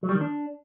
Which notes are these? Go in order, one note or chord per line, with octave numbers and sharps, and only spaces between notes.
F#3
G3
D#3
D4